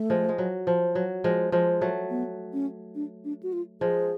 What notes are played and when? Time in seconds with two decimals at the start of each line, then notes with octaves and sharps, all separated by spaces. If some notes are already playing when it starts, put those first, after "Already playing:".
Already playing: A3
0.10 F3 G#3
0.29 G#3
0.38 F#3
0.67 F3
0.95 F#3
1.24 F3 G#3
1.52 F3 G#3
1.81 F#3 A3
2.10 B3
2.53 C#4
2.95 D4
3.25 D4
3.43 F#4
3.53 F4
3.81 F3 G#3 G#4